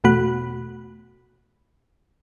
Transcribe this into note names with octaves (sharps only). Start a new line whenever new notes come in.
E2 B2 A3 F#4 B5 F#6